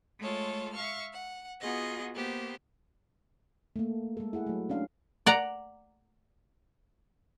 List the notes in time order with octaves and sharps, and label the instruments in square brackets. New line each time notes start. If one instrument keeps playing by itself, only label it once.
[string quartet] G#3 A3 F4 A4 C#5
E5 F5 C#6 F6
F#5
B3 F4 F#4 G#4 D#5 A#6
A#3 B3 G4 C5
[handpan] A3 A#3
G#3 A4
E4 G#4 F#5
F#3 A3
C#4 D4 F5
[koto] D5 F#5 A#5